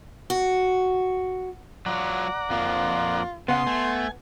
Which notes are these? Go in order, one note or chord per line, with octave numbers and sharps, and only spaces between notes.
F#4
F#3 F4 D5 F#5 A#5
F2 F3 A#3 F4
C#3 B3 F#5 C6
A3 G#5